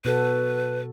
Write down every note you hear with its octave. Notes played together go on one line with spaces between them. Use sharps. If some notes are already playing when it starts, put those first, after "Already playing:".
B2 F#4 A4 B4